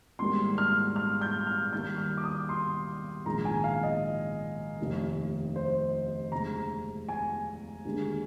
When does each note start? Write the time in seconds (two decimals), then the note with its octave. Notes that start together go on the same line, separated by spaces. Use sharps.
0.19 G#1 G#2 G3 A#3 C6
0.58 F6
0.96 F6
1.21 G6
1.47 F6
1.72 D#2 D#3 G3 A#3 G6
1.98 F6
2.17 D6
2.24 D#6
2.49 C6
3.25 A#1 G#2 D#3 G#3 A#5
3.45 G#5
3.64 F5
3.83 D#5
4.79 F1 D#2 D#3
5.56 C5
6.32 F1 D#2 D3 G#3 A#5
7.09 G#5
7.85 D#2 D3 G#3